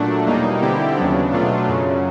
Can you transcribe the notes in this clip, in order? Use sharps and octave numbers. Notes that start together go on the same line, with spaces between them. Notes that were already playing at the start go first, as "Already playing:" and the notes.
Already playing: A#2 F#3 A3 D4
E2 B2 G3 A#3 D#4
D3 G3 C4 E4 G4
D#2 C#3 F#3 B3 D4
B2 F#3 A3 D4 F4
F#2 C#3 F#3